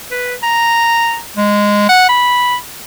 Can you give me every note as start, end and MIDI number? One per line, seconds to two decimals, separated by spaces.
0.11 0.34 71
0.43 1.19 82
1.37 1.86 56
1.89 2.07 78
2.09 2.56 83